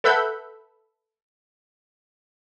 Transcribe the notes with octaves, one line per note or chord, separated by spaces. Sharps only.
A4 B4 E5 F#5 B5 G6